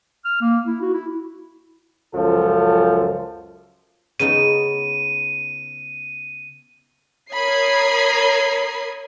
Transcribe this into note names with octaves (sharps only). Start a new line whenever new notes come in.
F6
A#3
E4
F#4
E4
C#2 F#2 F3 A4
C#3 B3 D#4 D#7
A#4 C#5 B5 D#6 G#6 C7